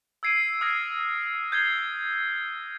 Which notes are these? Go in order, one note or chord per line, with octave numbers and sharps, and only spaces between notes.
E6 G#6 C7 D7 D#7
D#6 F6 G#6 A#6 C7
G6 G#6 C7 G7